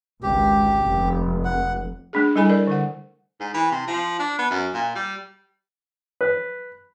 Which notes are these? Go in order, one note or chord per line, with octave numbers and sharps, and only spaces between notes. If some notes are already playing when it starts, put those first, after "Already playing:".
G#1 C#2 G4
F1
F#5
A3 D4 G#4
G3 E4 A4 G#5 B5
A#4 D5
D3 A4 F#5
G#2
E3
C3
F3
D4
B3
F#2
A#2
G3
B4